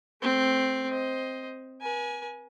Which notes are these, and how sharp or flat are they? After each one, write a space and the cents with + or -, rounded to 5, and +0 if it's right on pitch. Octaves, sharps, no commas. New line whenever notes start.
A3 -15 C4 +0
C5 +0 D#5 +10
B4 -45 G#5 +10